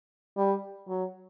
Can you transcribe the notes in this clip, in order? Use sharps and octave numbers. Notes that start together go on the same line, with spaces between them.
G3
F#3